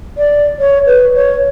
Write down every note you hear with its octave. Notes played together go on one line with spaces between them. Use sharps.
D5
C#5
B4
C#5